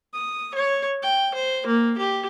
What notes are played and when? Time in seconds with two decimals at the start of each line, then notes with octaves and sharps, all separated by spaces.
0.14 D#6
0.54 C#5
1.03 G5
1.34 C5
1.66 A#3
1.97 G4